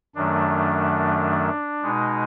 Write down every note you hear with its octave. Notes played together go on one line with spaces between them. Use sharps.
F#2 D#3 F#3 A3 D4
B2 G#3 D#4